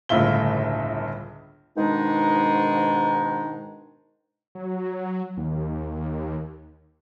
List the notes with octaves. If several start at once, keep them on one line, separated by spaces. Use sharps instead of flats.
G1 C#2 A2 F4 E5 G7
G#2 B2 D#3 G#3 D4 D#4
F#3
D#2